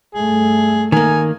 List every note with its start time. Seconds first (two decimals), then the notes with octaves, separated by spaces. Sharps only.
0.15 G2 A3 G#4
0.92 D#3 A#3 G#5